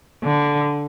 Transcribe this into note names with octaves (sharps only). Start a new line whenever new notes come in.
D3